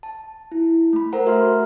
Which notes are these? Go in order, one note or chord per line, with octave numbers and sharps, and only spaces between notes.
A5
E4
A3 B5
A4 A#4 C5 F#5 A#5
F#4 E5 C6 F6